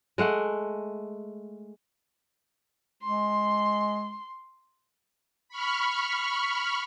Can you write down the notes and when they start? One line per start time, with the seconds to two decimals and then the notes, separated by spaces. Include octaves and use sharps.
0.18 G#3 A3 F#5
3.03 G#3 C6
5.49 B5 C#6 F6